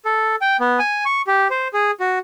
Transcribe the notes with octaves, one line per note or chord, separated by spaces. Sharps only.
A4
G5
B3
G#5
C#6
G4
C5
G#4
F#4